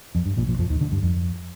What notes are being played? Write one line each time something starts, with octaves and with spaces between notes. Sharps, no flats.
F2
G2
A#1 A#2
A#1 A#2
F2 F3
D#2 D#3
D2 D3
G2
F2